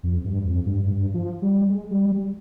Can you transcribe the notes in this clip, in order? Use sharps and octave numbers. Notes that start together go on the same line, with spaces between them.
F2
G2
F2
G2
G2
F3
G3
G#3
G3
G3